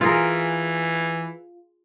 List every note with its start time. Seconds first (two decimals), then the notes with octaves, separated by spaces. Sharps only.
0.01 E3 F4 G#4 A#4